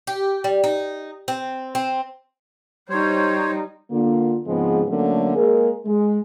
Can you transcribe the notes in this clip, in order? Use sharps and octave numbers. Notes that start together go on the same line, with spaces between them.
G4
G3
D#4
C4
C4
G3 D#4 C5 C#5
D3 A#3 F4
G#2 C#3 F3 G#3 B3 C4
D3 F#3 A3 A#3 C#4
G#3 A#3 G#4 A#4
G#3